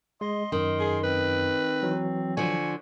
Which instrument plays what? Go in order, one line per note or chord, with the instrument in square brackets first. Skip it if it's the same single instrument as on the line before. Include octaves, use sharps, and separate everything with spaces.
[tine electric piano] G#3 [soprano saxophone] D#5 [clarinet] C6
[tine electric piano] F#2 [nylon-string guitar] D#3 [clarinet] C6
[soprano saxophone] G#4
[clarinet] C4 [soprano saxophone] B4
[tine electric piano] E3 F#3
[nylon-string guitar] D3 F3 [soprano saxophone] G#5 [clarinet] C#6